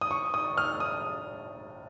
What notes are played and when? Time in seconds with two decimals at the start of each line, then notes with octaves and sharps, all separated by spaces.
0.01 D#6
0.11 C#6
0.34 D#6
0.57 F6
0.80 D#6